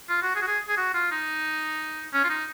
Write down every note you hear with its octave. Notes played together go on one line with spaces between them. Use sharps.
F4
F#4
G#4
F#4
G#4
G#4
F#4
F4
D#4
C#4
F4
D#4